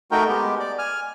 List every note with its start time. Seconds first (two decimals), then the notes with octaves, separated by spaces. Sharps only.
0.11 A3 D#4 F#4 A#4 G5
0.28 G#3 B3 G4
0.60 D5
0.78 G#5 F6